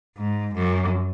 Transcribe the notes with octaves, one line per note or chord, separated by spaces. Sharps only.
G#2
F#2